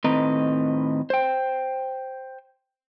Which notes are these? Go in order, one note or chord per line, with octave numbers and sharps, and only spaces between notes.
A2 D#3 C4 B4 D#5 A#5
C5 G5